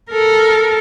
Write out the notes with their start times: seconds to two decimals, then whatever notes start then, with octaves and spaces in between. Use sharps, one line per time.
0.11 A4 A#4